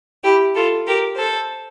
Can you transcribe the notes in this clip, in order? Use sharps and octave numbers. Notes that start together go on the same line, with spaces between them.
E4 G4
F4 A4
G4 A#4
A4 C5